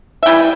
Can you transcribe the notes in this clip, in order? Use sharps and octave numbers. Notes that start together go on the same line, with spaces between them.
E5
E3 G3 E4 G5